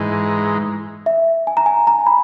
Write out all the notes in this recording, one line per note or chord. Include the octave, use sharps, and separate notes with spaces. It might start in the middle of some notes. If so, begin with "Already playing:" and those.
Already playing: G#2 E3 G#3 D#4
E5
G#5
A#5
G#5
A#5
B5